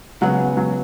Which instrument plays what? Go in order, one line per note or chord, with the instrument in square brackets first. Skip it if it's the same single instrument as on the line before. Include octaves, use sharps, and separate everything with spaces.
[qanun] C#3 G#3 B3 [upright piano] F#3
[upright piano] F#3